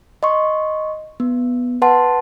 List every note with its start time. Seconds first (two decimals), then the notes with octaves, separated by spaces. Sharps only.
0.23 D#5 C6 C#6
1.20 B3
1.82 B4 F#5 A5 C6